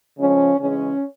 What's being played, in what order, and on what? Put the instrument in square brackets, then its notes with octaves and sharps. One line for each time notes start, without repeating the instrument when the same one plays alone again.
[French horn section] C#3 F3 G#3 C#4
C#3 E3 G#3 C#4